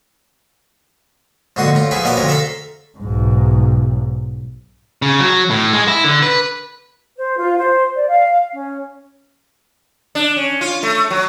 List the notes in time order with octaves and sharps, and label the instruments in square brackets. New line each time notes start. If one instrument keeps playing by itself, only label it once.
[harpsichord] A#1 G#2 D3 F#4 C6 D#6
A2 F4
F3 B3 E4 G#4
B1 A#2 B3 A#4 D#5 D6
D2 C3 F3 A#4 C#5
A4 E5 F5 A#5
[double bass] B1 G#2
[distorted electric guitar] C#3
F#3
A2
G#3
E4
D3
B4
[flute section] C5
F4
C5
D5
F5
C#4
[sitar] D4
C#4
F4
A3
F#3